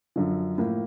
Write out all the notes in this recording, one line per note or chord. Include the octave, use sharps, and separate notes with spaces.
F#2 D3 F3
A2 F3 A#3